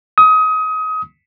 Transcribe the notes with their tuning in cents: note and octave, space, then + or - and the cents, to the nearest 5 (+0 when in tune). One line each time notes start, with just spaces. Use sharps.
D#6 +25